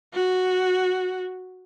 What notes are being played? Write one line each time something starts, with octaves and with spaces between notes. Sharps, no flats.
F#4